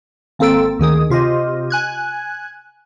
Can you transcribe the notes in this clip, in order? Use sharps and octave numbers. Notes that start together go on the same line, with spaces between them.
G#1 A#3 C4 A4 E6 D7
D2 D#3 G#4 D#6
C3 F4 G4 D#5
G#5 F#6 G#6